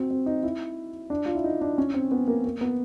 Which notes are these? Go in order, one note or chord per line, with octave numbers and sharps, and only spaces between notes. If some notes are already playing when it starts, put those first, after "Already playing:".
Already playing: C4 F#4
C4
D#4
E4
D4
F4
E4
D#4
D4
C#4
C4
B3
A#3
A#3
B3